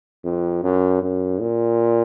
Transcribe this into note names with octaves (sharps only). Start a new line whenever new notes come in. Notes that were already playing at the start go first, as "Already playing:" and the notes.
F2
F#2
F#2
A#2